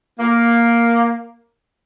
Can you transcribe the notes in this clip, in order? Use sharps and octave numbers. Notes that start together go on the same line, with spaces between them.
A#3